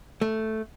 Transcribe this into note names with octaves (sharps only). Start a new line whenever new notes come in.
A3